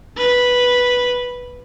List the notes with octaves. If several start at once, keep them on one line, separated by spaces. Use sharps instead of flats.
B4